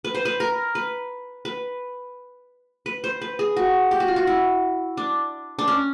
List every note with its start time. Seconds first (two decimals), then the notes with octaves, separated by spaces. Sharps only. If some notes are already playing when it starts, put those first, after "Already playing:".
0.05 B4
0.15 C5
0.25 B4
0.40 A#4
0.75 B4
1.45 B4
2.86 B4
3.04 C5
3.21 B4
3.39 G#4
3.56 F#4
3.91 G4
4.00 F#4
4.08 F4
4.16 F#4
4.27 E4
4.97 D4
5.59 D4
5.68 C#4